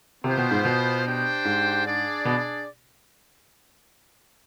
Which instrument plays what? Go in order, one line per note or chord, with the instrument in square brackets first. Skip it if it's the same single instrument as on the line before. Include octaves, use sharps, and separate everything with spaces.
[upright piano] C3 [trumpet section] B3 F4 C5 G5
[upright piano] B2
G#2
B2
[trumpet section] D4 G4 C5 G5
[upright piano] G#2
[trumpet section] D4 G#4 D5
[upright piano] B2